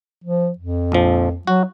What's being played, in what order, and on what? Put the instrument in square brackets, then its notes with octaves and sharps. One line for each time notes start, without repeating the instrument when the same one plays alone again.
[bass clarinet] F3
F2
[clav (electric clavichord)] A#1 F3
[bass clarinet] F#3 [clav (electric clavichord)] F#4